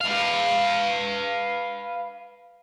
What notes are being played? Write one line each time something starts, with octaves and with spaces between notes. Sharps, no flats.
B4 F5